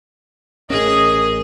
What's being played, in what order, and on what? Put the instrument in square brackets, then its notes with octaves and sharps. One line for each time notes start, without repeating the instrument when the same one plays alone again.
[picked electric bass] A1 C#4 [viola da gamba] G#4 [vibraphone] A#4 [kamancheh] D#5